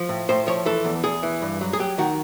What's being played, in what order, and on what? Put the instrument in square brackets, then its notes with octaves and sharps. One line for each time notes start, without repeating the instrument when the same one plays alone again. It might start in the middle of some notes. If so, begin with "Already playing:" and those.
Already playing: [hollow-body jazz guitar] F3
A2
A2 C5
F3 C#5
E3 A4
E2
E2 G#4
E3
G2
F#3
G#4
F#3 G4
D#3 F#4